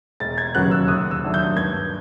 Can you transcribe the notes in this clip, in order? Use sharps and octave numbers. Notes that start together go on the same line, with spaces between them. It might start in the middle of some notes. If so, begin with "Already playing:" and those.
E1 A6
G#6
D#2 C#3 F#3 B3 F#6
E6
D#2 D#6
E6
D#3 F#3 A3 D4
G6
G2 G#6